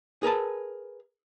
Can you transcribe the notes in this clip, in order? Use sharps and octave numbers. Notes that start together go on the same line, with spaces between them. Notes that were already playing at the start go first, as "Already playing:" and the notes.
G#4 A#4 B4 A5